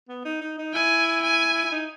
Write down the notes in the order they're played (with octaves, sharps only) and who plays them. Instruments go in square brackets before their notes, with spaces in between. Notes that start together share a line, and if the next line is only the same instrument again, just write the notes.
[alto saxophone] B3
D#4
D#4
D#4
[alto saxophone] E4 [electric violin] G#5
[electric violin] G#5
[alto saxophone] E4
D#4